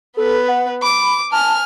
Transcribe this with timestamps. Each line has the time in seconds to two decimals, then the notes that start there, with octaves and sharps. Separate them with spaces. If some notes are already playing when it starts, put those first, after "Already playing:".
0.17 B3 A4 B4
0.48 F#5
0.82 B5 D6
1.32 G#5 A5 F6